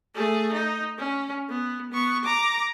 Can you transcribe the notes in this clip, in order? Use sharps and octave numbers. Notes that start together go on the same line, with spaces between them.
A3 G#4
D#4
C#4
B3
B3 C#6
A#5 D6